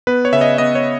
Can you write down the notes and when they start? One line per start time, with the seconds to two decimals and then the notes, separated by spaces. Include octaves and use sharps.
0.07 B3 B4
0.25 C#5
0.33 C#3 E5
0.41 D#5
0.58 B3 D#5
0.75 C#5